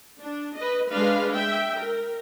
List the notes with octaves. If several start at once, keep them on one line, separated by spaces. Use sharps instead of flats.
D4
B4 D#5
G#3 D4 B4 F5
E5 G5
A#4